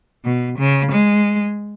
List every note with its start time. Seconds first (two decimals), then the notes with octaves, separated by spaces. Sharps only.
0.25 B2
0.59 C#3
0.92 G#3